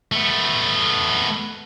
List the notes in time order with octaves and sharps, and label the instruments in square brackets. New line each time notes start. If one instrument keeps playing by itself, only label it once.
[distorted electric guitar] A3 B3